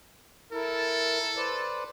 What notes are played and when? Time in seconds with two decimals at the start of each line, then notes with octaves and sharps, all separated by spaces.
0.52 E4 A4 A#4
1.37 B4 C5 D5